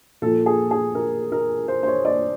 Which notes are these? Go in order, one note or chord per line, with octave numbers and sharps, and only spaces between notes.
A#2 F3 A4
G#4
G#4
A#4
A#4
C5
C5
C#5
D5